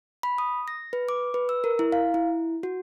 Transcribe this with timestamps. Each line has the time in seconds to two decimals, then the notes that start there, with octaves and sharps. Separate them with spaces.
0.23 B5
0.38 D#6
0.68 A#6
0.93 B4
1.09 D6
1.34 B4
1.49 E6
1.64 A#4
1.79 E4
1.92 F5
2.14 E4
2.63 F#4